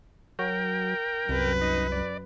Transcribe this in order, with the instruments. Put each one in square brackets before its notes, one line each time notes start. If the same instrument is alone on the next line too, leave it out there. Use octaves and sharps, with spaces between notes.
[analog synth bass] F#3 [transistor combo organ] A#4 G5
[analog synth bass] C2 [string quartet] F#2 B4
[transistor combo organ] D#4
D5